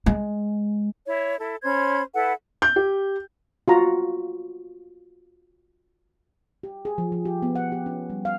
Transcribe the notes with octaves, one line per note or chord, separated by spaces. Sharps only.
G#3
E4 C#5
E4 A4
C#4 C5 B5 G#6
E4 A4 B4 F#5
G6
G4
F4 F#4 A#5
G4
G#4
F3
F3
G4
B3
F#5
G4
C#4
G3
F5